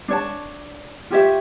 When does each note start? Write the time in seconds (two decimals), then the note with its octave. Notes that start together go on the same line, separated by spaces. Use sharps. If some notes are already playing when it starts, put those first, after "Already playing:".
0.08 D4 C#5 A5
1.10 F4 G4 C#5 E5